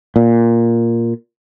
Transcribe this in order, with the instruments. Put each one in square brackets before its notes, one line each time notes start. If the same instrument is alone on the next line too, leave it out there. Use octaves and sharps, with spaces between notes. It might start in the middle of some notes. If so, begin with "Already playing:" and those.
[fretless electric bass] A#2